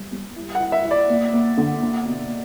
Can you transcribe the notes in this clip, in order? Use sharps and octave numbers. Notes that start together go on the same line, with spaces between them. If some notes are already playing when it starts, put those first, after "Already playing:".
Already playing: G3
G3
E4
F#5
E4
E5
E4
D5
A#3
A#3
D3
A#3
B2